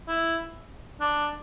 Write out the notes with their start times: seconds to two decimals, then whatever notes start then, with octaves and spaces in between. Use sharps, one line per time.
0.08 E4
1.01 D4